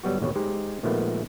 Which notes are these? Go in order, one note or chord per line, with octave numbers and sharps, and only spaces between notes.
G1 F#3 G3 B3 F#4
A1 D#2 B2 C#5
G#3 D#4 G4 C5
A#2 D#3 F3 G#3 A3 B3